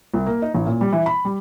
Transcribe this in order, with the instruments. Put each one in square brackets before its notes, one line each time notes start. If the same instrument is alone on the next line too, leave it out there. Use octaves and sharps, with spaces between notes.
[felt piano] C2
A#3
D#4
A1
A#2
G3
E3
B5
G3